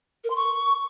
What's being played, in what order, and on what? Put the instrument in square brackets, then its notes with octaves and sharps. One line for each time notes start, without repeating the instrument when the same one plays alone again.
[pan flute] A#4
C6
C#6